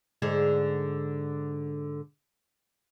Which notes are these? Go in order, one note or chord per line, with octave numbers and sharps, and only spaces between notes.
G#2 D3 G#4